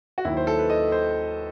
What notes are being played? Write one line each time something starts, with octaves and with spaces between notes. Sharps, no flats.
F#4
D#2 D#3 F#3 E4
C5
A4
B4
D#5
C5